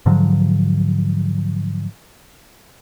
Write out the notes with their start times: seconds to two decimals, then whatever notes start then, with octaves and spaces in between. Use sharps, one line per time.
0.06 G#2 D3 F3 F#3